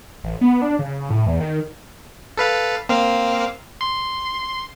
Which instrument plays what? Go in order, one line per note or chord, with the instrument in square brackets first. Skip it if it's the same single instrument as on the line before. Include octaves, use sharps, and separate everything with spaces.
[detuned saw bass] A1
B3
D4
C#3
A2
E2
D#3
[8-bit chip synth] A4 B4 F5
A#3 C4 F5
C6